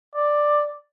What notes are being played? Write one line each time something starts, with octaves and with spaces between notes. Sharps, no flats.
D5